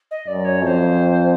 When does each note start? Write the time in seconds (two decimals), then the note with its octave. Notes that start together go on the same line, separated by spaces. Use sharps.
0.11 D#5
0.27 F#2 D5
0.45 C#5
0.62 F2 C#5
0.66 C5